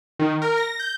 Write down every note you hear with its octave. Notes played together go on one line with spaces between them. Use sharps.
D#3
A#4
A#6
G6